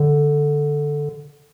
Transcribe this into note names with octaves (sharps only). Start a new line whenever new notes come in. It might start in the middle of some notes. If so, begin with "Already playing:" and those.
Already playing: D3